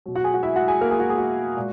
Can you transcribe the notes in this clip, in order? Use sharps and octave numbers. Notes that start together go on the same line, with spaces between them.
B2 F#3
F#4 F#5
G#4 G#5
F#4 F#5
E4 E5
F#4 F#5
G#4 G#5
A#3 A#4
G#4
F#4
G#4
F#4
A#2 G#3